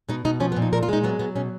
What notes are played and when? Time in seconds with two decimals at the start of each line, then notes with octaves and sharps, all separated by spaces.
0.09 B2 D#4
0.25 B2 D#4
0.40 F3 C#4
0.52 B3
0.56 A#2
0.62 D#4
0.73 A#2 A#4
0.83 F4
0.89 G#3 D#4
1.03 F#3 B3
1.19 F#3 B3
1.35 B2 C#4